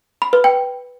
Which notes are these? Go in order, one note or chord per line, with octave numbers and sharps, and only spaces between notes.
B5
B4
G5